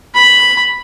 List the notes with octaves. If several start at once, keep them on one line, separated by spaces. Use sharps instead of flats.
B5